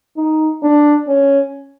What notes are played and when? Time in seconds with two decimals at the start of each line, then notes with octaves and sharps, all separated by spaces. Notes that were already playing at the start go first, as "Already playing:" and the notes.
0.17 D#4
0.63 D4
1.08 C#4